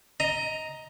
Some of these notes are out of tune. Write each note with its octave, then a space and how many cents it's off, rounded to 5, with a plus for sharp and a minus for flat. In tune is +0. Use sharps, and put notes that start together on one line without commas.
D#5 +15 A#5 +0